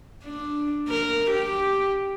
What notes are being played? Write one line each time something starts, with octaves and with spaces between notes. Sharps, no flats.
D4
A#4
G4